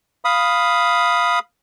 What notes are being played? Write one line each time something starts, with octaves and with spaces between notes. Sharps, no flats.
F5 B5 D#6